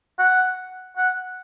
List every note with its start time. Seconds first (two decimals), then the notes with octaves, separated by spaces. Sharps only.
0.19 F#5
0.98 F#5